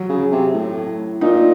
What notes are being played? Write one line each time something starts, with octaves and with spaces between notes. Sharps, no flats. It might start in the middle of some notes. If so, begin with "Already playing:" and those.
Already playing: F#3
C#3
C3
A2
A#2 D#4